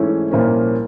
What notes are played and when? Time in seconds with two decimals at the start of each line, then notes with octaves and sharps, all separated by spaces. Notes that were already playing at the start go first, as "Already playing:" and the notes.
Already playing: G#2 E3 A3 C#4 E4
0.31 C2 A#2 F3 A#3 C#4